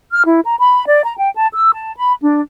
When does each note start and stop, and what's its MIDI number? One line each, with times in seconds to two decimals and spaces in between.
0.12 0.23 89
0.25 0.40 64
0.45 0.54 82
0.58 0.84 83
0.86 1.03 74
1.05 1.15 82
1.18 1.29 79
1.35 1.46 81
1.53 1.71 88
1.74 1.91 81
1.96 2.13 83
2.21 2.40 62